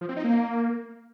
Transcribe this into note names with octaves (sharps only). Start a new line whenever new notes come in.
F3
C4
D#4
A#3